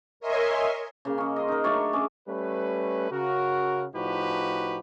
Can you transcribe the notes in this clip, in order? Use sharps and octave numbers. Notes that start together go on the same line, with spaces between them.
A#4 C#5 D#5 E5 G#5 C6
C#3 A#3
C#4 D#5
D#5 C6
D#4 A#4
F#3 A3 D4 C#5
C#4 G#4 D6
G3 A3 C#4 B4
C#3 F#4 A#4
A2 F3 D#4 F#4 G4 B4